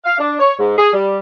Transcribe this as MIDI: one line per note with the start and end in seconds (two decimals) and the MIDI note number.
0.05 0.17 77
0.18 0.37 62
0.39 0.53 73
0.58 0.76 44
0.78 0.88 68
0.92 1.19 55